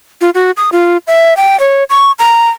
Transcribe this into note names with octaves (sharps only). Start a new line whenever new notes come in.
F4
F#4
D#6
F4
E5
G5
C#5
C#6
A#5